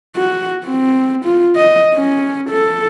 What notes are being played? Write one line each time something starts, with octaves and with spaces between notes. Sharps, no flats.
F#4
C4
F4
D#5
C#4
A4